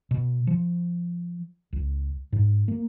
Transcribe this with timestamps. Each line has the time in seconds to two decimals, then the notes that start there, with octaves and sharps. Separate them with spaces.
0.11 B2
0.47 F3
1.73 C#2
2.33 G#2
2.68 A#3